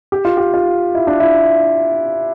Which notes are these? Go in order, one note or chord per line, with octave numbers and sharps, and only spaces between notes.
G4
F4
G4
F4
E4
D4
E4